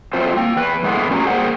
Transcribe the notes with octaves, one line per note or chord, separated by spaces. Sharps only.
F#3 A3 C4 F4 C5
A#3 G5
E2 B4
E2 A2 E3 G#3 B3
A#2 C#4 F#4 G4 D#5 A#5
A#3 G#4 A#4 C5 F#5 G5